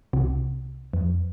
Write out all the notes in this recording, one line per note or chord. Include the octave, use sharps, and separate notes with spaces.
C2 C3
F2